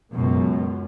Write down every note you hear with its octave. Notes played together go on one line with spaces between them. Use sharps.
C#2 F#2 B2